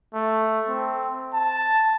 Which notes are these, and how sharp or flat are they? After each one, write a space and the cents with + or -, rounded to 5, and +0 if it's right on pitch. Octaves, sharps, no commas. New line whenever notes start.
A3 +0
C4 -5
A5 +0